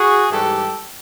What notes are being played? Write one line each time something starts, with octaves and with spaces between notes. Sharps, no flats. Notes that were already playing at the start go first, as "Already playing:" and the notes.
Already playing: F#4 G#4
G#2 E3 G3 G4 A4